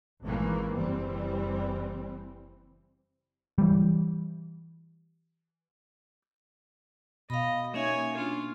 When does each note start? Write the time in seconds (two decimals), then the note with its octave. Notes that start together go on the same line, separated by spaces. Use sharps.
0.24 G#1 D#3 E3 A#3
0.74 F#1 E3 G3 C4
3.58 E3 G3
7.30 B2 D#5 F5 B5
7.74 A#3 C#4 D#4 C#5 E5 G#5
8.17 D4 F4